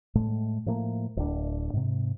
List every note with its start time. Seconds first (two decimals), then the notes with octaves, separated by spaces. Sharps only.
0.15 A2 G#3 A3
0.66 A2 F3 A3 A#3
1.17 D1 D4
1.73 G#2 C3